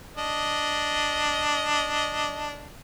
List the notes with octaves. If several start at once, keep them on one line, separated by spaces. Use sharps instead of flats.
D4 D#5